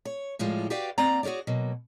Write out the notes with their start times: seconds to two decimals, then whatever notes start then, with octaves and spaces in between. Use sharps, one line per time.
0.05 C#5
0.39 A2 F3 G3 G#3 F4
0.70 F#4 G4 B4 D5 F5 G5
0.98 A#3 C4 D5 A#5
1.23 F#4 G#4 A#4 C#5 D5
1.47 B2 F#3 A#3